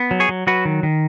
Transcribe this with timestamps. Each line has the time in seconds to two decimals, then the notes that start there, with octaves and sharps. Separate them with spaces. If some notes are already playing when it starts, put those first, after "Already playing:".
Already playing: B3
0.11 F#3
0.20 G#4 C#5
0.29 F#3
0.47 F#3 F#4 B4
0.65 D#3
0.83 D#3